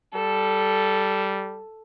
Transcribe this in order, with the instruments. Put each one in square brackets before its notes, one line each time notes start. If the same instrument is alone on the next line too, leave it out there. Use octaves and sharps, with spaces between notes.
[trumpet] G3 [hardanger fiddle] A4